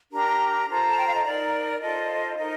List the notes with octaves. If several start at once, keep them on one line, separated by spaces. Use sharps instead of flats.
D4 G4 A#4 A#5
F4 A4 C5 A#5
A5
G5
F5
D#5
D#4 A#4 D5
F4 A4 C5 D#5
D#4 A#4 D#5